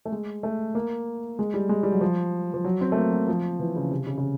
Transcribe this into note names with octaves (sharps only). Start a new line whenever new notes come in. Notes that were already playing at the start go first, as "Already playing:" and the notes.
A3
G#3
A3
A#3
G#3
G3
G#3
G3
F#3
F3
F3
F#3
C4
A3
A#3
F#3
F3
E3
C#3
C3
C#3
C#3